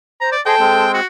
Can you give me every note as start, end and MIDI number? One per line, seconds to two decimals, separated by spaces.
0.21 0.36 72
0.21 0.29 82
0.32 0.41 74
0.46 0.55 68
0.46 0.86 69
0.46 0.55 72
0.46 0.55 75
0.46 0.92 79
0.46 0.85 81
0.59 1.00 56
0.59 1.00 60
0.94 1.06 66